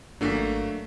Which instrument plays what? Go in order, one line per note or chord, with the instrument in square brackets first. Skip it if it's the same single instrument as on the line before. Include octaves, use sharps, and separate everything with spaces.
[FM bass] G#1 [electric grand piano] F#3 A3 A#3 [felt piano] D4 B6